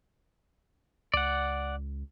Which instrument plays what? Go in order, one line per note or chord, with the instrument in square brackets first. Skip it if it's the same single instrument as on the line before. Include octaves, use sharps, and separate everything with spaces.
[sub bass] C#2 [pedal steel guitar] D5 F#5